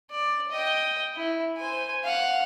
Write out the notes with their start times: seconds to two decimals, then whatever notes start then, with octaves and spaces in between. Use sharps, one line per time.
0.11 D5
0.51 D#5 G5
1.16 E4
1.57 C5 G#5
2.04 F5 F#5